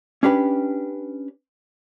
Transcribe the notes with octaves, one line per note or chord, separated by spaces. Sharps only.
C#4 D4 G4 B4